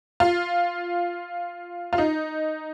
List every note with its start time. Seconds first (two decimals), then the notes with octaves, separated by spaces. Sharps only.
0.20 F4
1.93 F4
1.98 D#4